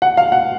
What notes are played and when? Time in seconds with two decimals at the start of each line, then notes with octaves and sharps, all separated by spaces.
0.02 F#5
0.17 F5
0.32 F#5